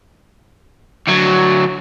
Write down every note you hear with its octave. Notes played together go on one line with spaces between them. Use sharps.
D2 F#3